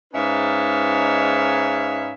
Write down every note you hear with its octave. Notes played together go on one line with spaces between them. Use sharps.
G#2 C#4 D#4 B4 E5 F5